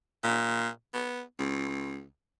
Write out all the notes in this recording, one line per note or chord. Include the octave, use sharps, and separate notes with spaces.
A#2
B3
C#2